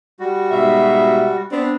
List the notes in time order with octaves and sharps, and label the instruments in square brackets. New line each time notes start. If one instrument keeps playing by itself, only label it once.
[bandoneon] G3 F#4
[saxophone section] G#2 B2 E5
B3 C4 D4